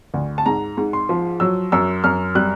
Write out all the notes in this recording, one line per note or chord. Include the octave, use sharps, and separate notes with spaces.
D2
A5
G#2 A#5
G#2
C6
F3
F#3 E6
F#2 E6
F#2 F6
G3 F#6